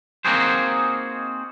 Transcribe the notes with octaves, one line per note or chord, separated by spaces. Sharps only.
A#3 C4 D#4 F#4 G#4 C5